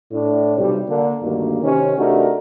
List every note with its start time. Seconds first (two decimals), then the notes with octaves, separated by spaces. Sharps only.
0.12 A2 D4
0.58 B1 C3 G3
0.89 D3 A#3 D4
1.22 D2 G2 D#3 A#3
1.62 C3 D#3 C#4
1.98 C3 A3 D4 D#4 F#4 A#4